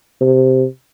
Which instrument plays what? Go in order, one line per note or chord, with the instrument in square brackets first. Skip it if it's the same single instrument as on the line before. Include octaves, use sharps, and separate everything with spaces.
[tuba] C3